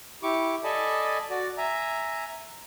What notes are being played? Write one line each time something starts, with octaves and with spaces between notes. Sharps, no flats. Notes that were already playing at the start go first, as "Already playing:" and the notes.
E4 G4 C#6 D6
A4 D5 D#5 G#5 A5 B5
F#4 D5
E5 G#5 A#5